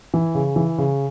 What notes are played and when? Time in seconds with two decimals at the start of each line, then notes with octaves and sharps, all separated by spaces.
0.14 E3
0.35 C#3
0.56 E3
0.78 C#3